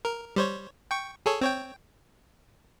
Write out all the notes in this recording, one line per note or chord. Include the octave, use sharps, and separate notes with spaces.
A#4
G3 C5 C#5
G5 C#6
G#4 A4 C#5
C4 C#5 G5